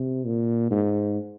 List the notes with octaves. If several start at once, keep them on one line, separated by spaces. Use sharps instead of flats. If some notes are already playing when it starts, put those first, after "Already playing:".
Already playing: C3
A#2
G#2